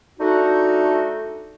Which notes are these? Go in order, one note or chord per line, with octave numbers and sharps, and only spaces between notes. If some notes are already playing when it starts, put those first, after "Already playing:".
A3 D4 D#4 F#4